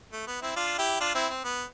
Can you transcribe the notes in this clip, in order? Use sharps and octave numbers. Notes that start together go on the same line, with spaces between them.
A3
B3
C4 E4
D4 F4
E4 G4
D4 F4
C4 E4
C4
B3